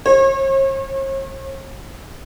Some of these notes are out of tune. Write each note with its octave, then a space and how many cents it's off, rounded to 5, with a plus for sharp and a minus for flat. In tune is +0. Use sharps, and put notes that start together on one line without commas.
C#5 -45